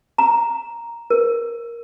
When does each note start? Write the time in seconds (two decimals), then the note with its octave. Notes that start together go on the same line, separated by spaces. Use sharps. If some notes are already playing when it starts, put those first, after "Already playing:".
0.18 A#5
1.10 A#4